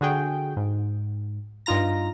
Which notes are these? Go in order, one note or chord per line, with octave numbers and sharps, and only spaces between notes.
D3 F#4 G#4 G5
G#2
G2 D#4 F4 A#5 A#6